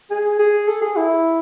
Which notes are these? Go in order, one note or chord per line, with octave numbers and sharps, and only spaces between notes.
G#4
G#4
A4
G#4
E4